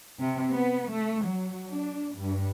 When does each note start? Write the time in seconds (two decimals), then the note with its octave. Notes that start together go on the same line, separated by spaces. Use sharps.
0.20 C3
0.52 B3
0.92 A3
1.26 F#3
1.70 D4
2.15 G2